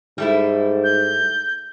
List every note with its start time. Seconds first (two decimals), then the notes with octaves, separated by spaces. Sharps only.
0.18 G#2 G3 A3 E4
0.83 G6